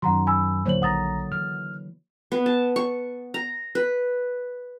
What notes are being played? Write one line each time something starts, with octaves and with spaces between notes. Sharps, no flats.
F#2 D#3 F#3 F#5 A#5 C6
G#5 B5 E6
D2 A2 D3 F#3 A#3 C5 C#5 F#7
A#1 F#5 A#5 D#6 A6
E3 F6
B3
A5
C#6
A#5
B4